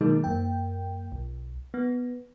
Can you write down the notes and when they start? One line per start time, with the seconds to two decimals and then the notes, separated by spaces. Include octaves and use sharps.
0.01 B2 D#3 F#3 G#3 A#3 D#4
0.24 F#2 A#3 G5
1.12 B1
1.74 B3